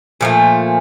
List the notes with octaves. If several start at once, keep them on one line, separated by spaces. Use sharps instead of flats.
A#2 F3 A3